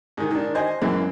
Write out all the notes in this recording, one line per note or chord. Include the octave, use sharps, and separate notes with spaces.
G#2 D#3
D#3 D4
C5 D#5 G#5
F#2 E3 G#3 A#3